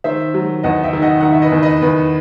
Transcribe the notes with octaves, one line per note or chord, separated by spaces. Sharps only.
D#3 C5 E5
F#3
E2 D#5 F#5
E5 G5
D#3
D#5 F#5
D#3 F#5
E5
B4 D#5
E2
B4 D#5
E2 B4